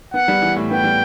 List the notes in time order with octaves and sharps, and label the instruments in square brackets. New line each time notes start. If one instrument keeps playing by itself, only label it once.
[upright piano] B3 [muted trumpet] F#5
[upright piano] G3
E3
A2
[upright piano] B3 [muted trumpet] G5
[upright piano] G3